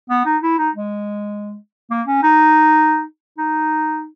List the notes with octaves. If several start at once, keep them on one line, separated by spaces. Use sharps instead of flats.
B3
D#4
E4
D#4
G#3
A#3
C#4
D#4
D#4